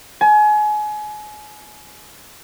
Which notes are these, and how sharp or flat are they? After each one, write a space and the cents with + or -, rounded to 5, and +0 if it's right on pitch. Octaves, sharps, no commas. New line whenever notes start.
G#5 +30